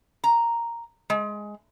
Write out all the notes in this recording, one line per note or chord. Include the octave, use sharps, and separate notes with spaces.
A#5
G#3